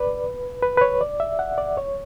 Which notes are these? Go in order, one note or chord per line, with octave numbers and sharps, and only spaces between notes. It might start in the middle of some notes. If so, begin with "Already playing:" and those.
Already playing: B4 D5
B4
B4
C#5
D5
E5
F#5
D5
C#5